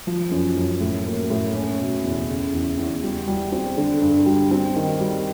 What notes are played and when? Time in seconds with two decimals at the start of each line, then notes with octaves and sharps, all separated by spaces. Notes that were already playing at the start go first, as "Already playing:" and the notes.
0.07 F3
0.31 F#2
0.56 F#2
0.81 A2
1.06 A#3
1.30 A2
1.55 C#4
1.80 B2
2.04 E2
2.29 C#3
2.53 E2
2.78 E2
3.03 G3
3.28 G3
3.52 C4
3.77 D3
4.02 G2
4.26 G3
4.51 C4
4.76 D#3
5.00 G3